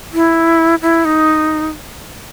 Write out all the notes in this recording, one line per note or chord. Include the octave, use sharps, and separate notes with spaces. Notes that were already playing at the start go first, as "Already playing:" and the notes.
E4
E4
D#4